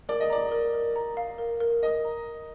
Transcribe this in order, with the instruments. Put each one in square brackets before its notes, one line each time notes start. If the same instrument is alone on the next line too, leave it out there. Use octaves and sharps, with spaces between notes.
[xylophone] A#4 [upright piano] D5
[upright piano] D#5
[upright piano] D5 [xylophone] A#5
[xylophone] A#4
A#4
A#5
F5
A#4
A#4
[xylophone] A#4 [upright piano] D#5
[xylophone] A#5